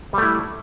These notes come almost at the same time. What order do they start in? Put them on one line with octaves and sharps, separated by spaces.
G3 A3 E4